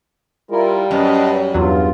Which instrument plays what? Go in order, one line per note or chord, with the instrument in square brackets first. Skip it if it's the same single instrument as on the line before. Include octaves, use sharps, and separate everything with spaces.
[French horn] G3 [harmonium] E4 F4 A#4
[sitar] F#2 [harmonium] B4 D#5 A5
[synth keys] E2 F#3 [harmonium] G2 F4